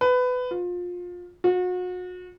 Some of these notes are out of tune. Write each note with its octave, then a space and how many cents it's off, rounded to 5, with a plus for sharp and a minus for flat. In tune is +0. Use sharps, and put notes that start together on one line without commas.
B4 +20
F4 +25
F#4 -35